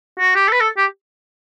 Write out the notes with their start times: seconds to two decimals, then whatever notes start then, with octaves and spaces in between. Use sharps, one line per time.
0.19 F#4
0.35 G4
0.48 A4
0.52 B4
0.61 A4
0.77 G4